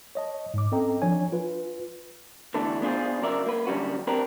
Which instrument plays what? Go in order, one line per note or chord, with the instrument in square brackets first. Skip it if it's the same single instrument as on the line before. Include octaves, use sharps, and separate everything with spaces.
[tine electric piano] C#5 D#5 A5
G#2 D6
C4 C#4 A4 D#5 G5 A#5
F3 D4 C#5 G#5
F4 B4
[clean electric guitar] E2 D3 E3 A3 D4
B3 D4 F4 G#4 C5
C#3 F#3 A#4 D5 E5
A#3 B4
D3 F#3 G3 C#4 F#4
C4 D4 G4 A#4 B4